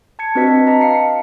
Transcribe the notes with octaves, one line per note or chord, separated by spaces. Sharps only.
A5 G#6 C#7
C4 D4 F#4 B4 D#5 B6
D#5 A5 A#5
F5 C7 C#7